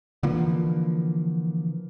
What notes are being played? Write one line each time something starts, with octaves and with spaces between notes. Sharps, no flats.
D3 E3 F3 A#3